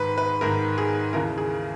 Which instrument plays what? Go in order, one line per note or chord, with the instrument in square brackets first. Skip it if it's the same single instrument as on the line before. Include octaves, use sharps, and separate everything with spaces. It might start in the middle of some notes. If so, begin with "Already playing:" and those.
Already playing: [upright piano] G#2 D#3 B4
B4
G#2 D#3 A#4
G#4
D#2 C#3 E3 A#4
G#4